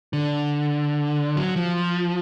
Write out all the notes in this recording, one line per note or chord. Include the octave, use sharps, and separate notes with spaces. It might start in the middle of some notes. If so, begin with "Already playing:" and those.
D3
F#3
F3